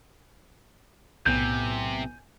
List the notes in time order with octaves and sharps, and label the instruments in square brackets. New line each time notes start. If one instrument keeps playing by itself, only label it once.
[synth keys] B1 A2 B3 [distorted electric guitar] C3 [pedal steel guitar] G#5 G6